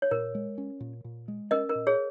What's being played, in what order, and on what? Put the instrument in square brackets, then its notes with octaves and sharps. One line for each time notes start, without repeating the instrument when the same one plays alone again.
[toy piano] C#5
[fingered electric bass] A#2 [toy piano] A#4
[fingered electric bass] G#3
C#4
A#2
A#2
G#3
[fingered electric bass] C#4 [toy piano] A#4 D#5
[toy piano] A#4
[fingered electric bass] A#2
[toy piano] G#4 C#5